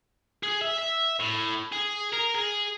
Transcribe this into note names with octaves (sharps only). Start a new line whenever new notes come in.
G#4
E5
E5
A2
G#4
A#4
G#4